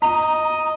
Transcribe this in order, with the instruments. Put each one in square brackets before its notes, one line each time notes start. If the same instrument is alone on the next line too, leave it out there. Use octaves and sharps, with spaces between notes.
[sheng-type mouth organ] D#5 [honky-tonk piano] A#5